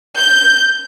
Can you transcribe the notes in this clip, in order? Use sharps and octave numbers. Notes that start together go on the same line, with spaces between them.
G6